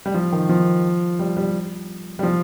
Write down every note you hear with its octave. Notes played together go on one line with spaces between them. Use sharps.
G3
F3
D#3
F3
G3
G3
G3
F3